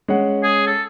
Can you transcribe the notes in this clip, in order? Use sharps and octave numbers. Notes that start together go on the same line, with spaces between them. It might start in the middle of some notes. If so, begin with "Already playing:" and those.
G#3 C#4 F#5
G#4
A4